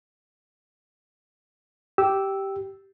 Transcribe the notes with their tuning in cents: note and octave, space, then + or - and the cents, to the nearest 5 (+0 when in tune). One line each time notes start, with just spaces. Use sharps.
G4 -10 E6 -5